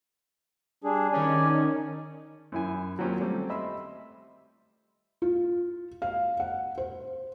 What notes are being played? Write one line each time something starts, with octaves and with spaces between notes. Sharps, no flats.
G3 D4 G#4
D#3 C#4 D5 G#5
F#2 E4 G#5
F#3 A#3 C4 C#4 F4 G4
G3 A3 C4
D#5 E5 B5 C6 E6
F4
F5
F#5
C5